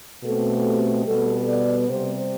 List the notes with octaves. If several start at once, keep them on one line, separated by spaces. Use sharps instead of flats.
B2 A3 C4 A4
G4
B2 G3 B3 A4
D5
C3 G3 C4 C5